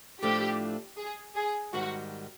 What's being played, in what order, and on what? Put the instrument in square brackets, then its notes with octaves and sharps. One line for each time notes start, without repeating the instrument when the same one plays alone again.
[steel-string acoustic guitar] A2 F3 A3 D4 [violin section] G4
[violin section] G#4
G#4
[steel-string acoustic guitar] G#2 D#3 G3 [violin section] F#4